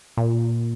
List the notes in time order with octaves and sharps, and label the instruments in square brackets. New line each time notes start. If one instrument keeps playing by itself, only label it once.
[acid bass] A#2